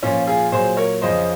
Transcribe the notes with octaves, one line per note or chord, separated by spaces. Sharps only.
A#2 F3 C#4 F4
F4 G#4
A#2 F#3 G#4 C5
A#4 C#5
F2 C#3 F3 C5 D#5